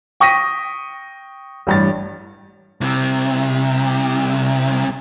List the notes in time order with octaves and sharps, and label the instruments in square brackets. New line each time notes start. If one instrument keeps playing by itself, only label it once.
[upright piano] G5 C#6 D#6 A#6 B6 D#7
A1 G2 A6
[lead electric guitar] C2 C3